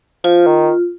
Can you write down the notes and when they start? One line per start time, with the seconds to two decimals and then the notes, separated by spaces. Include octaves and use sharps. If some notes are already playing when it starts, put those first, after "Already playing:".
0.24 F3 F4
0.47 D#3